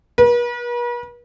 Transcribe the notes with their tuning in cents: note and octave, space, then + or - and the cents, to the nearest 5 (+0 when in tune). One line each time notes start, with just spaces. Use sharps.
B4 -45